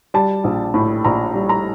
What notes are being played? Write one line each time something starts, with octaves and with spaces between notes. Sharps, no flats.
G3 A5
A#1
A2
A#1 A#5
G3
A#5